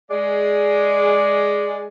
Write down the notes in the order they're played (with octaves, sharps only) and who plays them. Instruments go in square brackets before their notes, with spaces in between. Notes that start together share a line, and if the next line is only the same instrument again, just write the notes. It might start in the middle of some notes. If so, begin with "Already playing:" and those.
[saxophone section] G#3 D5